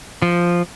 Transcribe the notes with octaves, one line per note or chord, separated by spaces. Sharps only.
F3